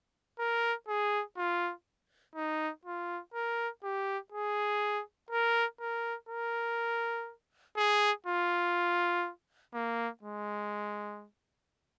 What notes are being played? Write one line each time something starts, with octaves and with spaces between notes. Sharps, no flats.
A#4
G#4
F4
D#4
F4
A#4
G4
G#4
A#4
A#4
A#4
G#4
F4
A#3
G#3